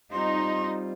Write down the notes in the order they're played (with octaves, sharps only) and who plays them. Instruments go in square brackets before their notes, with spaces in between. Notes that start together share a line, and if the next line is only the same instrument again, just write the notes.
[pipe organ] G3 C4 F4 [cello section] D#4 [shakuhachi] C6